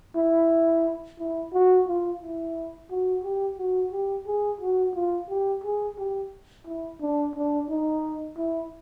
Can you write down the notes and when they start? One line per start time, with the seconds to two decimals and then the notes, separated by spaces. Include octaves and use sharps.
0.16 E4
1.19 E4
1.53 F#4
1.88 F4
2.22 E4
2.90 F#4
3.24 G4
3.58 F#4
3.92 G4
4.27 G#4
4.61 F#4
4.95 F4
5.30 G4
5.64 G#4
5.98 G4
6.67 E4
7.01 D4
7.35 D4
7.70 D#4
8.38 E4